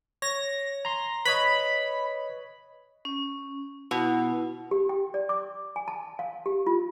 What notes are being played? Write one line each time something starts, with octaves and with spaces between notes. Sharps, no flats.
C#5 A#6
A#5 C6
B4 C#5 D#5 B5
C#4
B2 E4
G4
G5
D5
D6
G#5
A5
F5
G4
F4